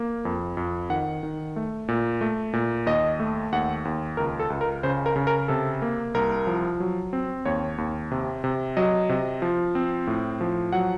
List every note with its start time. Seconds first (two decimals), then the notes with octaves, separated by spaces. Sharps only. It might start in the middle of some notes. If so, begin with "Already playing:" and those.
Already playing: A#3
0.25 F2
0.57 F2
0.90 D#3 F#5
1.23 D#3
1.56 A3
1.88 A#2
2.21 A3
2.53 A#2
2.86 D#2 D#5
3.20 A3
3.52 D#2 F#5
3.85 D#2
4.17 C#2 A#4
4.40 A4
4.50 C#2
4.61 A#4
4.83 C#3 C5
5.06 A#4
5.16 C#3
5.27 A#4
5.48 C3 A4
5.82 A#3
6.14 C2 A#4
6.47 F3
6.80 F#3
7.13 C4
7.45 D#2 C#5
7.78 D#2
8.12 C3
8.44 C3
8.77 F#3 D#5
9.09 C3
9.42 F3
9.75 C4
10.07 A2
10.41 F3
10.72 F#3 F#5